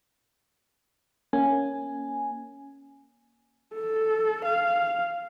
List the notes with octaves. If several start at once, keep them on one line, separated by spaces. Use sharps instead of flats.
A#3 C#4 G#5
A4
F5